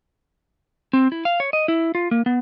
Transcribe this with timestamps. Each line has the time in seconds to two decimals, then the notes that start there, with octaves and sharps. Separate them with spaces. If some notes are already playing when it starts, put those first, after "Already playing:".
0.93 C4
1.12 E4
1.25 F5
1.40 C#5
1.53 D#5
1.68 E4
1.95 F4
2.11 A#3
2.26 B3